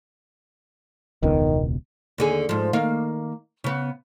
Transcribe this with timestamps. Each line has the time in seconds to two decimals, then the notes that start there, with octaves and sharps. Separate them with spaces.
1.23 E1 C#2 B2 D#3
2.18 D#2 D3 G#4
2.49 G#2 F3
2.73 D#3 A#3 F5
3.64 C#3 B3